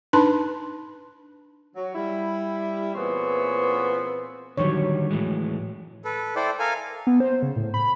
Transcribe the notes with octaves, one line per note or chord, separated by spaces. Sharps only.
D4 D#4 B4 A5 B5 C6
F#3
G3 E4
A#2 E3 B3 C4 G#4 C#5
D3 D#3 F#3 G3 C#5
A2 E3 G#3
A4 B4
E4 A4 C5 D5 G5
A4 A#4 F5 G#5
B3
C5
C#3
A2
B5